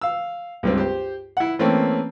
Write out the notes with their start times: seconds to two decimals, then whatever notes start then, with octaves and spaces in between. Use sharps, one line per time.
0.02 F5 E6
0.63 C#2 G2 C4
0.77 G4 C5
1.37 E4 F#5
1.59 E3 A3 A#3 C4 C#4